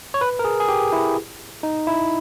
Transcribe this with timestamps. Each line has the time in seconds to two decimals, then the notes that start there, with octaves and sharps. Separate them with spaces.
0.14 C#5
0.21 B4
0.39 A#4
0.44 G#4
0.60 G#4
0.68 G4
0.92 E4
1.63 D#4
1.87 E4